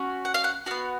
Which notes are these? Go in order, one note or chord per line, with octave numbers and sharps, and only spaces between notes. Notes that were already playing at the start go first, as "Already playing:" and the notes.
Already playing: C#4 F#4
F#5
F5
F#5
B3 F#4 F5